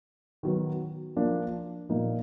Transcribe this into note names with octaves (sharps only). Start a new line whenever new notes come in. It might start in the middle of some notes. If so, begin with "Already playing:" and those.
D#3 F#3 B3
F3 A#3 D4
A#2 F3 A#3 D#4